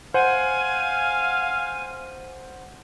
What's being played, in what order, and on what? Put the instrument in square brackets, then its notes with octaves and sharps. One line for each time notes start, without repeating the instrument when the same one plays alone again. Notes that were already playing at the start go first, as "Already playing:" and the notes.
[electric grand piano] C5 F#5 [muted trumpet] F5 [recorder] G#5